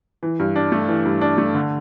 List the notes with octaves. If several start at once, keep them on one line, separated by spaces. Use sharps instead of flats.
E3
G2
D4
A3
E3
G2
D4
A3
D3